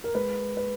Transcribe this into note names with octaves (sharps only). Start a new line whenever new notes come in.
A#4
G#3 B4
B4